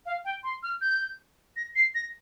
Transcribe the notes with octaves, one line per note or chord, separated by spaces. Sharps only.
F5
G5
C6
F6
G6
A#6
C7
A#6